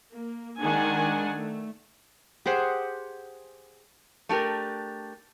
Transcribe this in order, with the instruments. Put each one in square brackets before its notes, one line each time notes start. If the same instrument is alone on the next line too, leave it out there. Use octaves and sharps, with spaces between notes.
[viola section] A#3
D#3 G#3 D4 F#5 G#5
A3
[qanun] G4 G#4 C5 F#5
[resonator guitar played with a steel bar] A3 D4 G4 A#4